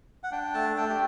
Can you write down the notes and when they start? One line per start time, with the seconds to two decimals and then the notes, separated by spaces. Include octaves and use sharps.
0.23 F#5
0.31 D4 G5
0.54 A3 A5
0.76 A3 G5
0.89 G4